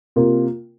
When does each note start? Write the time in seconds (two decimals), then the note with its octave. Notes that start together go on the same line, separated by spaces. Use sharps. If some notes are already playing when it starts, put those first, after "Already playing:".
0.16 C3 A#3 F4 A#4